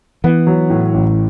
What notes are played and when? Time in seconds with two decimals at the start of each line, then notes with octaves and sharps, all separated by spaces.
0.24 E3 B3
0.47 F#3
0.70 A2
0.94 A1